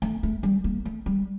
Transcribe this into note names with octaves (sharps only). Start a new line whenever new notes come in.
A3
A3
G3
A#3
A3
G3